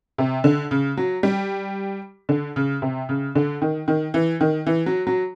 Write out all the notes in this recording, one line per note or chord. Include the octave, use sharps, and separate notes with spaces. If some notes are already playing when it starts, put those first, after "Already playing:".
C3
D3
C#3
F#3
G3
D3
C#3
C3
C#3
D3
D#3
D#3
E3
D#3
E3
F#3
F#3